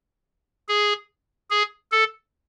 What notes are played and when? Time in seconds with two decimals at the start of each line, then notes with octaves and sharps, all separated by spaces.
0.68 G#4
1.50 G#4
1.92 A4